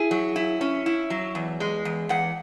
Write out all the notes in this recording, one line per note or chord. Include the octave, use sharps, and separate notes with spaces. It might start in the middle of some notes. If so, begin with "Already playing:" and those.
Already playing: E4 G#4
F#3
E4
C#4
E4
F#3
E2
G#3
E2
E2 F#5